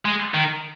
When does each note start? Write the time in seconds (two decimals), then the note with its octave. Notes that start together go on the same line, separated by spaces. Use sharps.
0.05 G#3
0.34 D#3